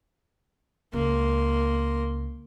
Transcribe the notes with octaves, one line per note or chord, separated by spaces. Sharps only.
C#2 A#3 C6